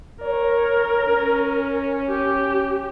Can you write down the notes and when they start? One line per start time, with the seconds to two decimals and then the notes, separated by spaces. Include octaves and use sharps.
0.22 A#4 C#5
1.08 C#4
2.10 G4